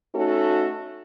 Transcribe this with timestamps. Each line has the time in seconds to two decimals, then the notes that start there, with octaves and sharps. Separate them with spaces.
0.14 A3 C#4 D#4 F#4 A4